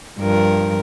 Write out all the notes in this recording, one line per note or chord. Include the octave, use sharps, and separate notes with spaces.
G2 F3 A#4